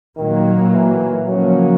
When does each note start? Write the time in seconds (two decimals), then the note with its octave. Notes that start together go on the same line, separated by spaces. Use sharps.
0.17 A#2 D#3 F#3 A#3
0.73 E3
1.27 C#3 F3 F#3 A#3 C#4